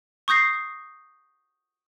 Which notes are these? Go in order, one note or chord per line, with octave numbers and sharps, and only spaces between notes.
C#6 D#6 G6 A#6 C7